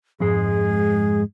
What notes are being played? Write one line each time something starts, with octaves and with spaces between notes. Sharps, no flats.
F2 G#2 G#3 G#4